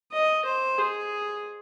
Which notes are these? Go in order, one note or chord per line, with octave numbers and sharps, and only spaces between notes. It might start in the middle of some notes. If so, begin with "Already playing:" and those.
D#5
C5
G#4